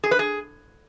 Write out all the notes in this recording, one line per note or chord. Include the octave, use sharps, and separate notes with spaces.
G#4
B4
G#4